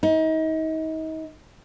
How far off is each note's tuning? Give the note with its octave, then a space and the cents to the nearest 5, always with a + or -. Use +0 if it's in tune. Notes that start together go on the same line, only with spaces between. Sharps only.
D#4 +35